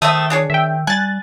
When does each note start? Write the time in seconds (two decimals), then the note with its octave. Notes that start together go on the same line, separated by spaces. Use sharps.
0.02 D#3 A3 C4 E5 D#6
0.30 D4 G#4 C#5
0.50 D#3 E5 G5
0.87 G3 G#5 F#6 A6